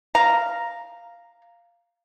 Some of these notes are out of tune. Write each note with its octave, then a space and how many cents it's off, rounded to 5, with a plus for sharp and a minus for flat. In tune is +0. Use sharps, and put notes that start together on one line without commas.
F5 -5 A#5 +0